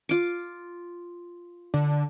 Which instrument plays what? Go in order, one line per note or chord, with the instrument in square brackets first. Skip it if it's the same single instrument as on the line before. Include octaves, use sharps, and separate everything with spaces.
[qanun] F4 D6
[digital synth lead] D3